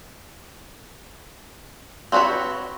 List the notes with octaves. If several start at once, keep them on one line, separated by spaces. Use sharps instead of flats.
C4 F#4 G#4 B4 C#5